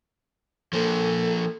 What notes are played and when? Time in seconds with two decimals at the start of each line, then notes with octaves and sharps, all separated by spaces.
0.73 F3 A#3 A4